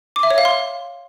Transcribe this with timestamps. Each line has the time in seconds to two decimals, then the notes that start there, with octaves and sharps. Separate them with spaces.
0.16 D6
0.23 E5
0.31 C#5
0.38 F5
0.45 C6